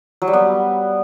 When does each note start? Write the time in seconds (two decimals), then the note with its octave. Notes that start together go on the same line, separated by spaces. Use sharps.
0.22 F#3
0.27 G3
0.33 B3